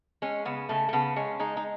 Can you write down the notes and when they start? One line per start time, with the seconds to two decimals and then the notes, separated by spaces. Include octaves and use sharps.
0.22 G#3 C#4
0.45 C#3 B3
0.69 C#3 A3
0.89 A3
0.93 C#3 B3
1.16 G#3 C#4
1.39 G#3 D#4
1.57 D#4